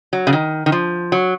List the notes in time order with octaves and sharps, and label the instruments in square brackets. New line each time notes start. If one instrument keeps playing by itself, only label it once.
[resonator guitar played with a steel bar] F#3
C#3
D#3
D#3
F3
F#3